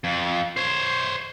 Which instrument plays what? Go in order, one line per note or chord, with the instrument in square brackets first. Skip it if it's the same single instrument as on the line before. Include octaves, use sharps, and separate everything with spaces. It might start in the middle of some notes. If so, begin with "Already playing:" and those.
[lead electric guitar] F2
C5 C#5